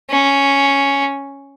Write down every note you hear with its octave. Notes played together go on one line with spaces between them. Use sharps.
C#4